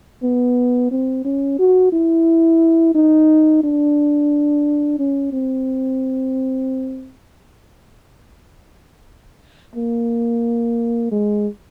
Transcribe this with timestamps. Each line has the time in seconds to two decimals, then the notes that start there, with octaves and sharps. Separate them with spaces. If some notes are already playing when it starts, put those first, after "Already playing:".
0.23 B3
0.91 C4
1.25 C#4
1.59 F#4
1.92 E4
2.95 D#4
3.64 D4
4.99 C#4
5.33 C4
9.76 A#3
11.12 G#3